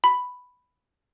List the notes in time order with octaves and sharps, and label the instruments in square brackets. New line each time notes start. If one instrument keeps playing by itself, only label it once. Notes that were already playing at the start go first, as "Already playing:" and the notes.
[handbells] B5